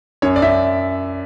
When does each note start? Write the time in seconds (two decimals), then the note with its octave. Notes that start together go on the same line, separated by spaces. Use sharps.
0.22 F#2 C#5
0.36 D5
0.42 F#2 E5